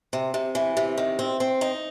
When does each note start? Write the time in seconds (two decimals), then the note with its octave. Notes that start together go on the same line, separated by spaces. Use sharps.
0.13 C3
0.34 C3
0.55 E3
0.77 C3
0.98 D#3
1.19 C4
1.40 C4
1.61 D#4